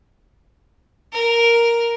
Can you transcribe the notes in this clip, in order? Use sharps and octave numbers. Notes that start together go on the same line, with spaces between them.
A#4